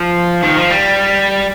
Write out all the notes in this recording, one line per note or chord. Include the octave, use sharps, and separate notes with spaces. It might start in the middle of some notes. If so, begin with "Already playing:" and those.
Already playing: F3
D#3
F3
G3